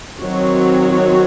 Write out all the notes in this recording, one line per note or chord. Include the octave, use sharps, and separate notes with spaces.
D#3 F#3 C4 F#4 C#5